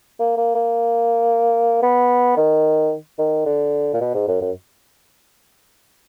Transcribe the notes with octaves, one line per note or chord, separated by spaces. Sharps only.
A#3
A#3
A#3
B3
D#3
D#3
D3
A#2
B2
G#2
F#2
F#2